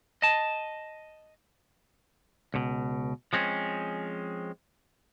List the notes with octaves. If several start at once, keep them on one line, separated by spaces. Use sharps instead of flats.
D#5 A5
C#2 B2
F3 G#3 C4 C#4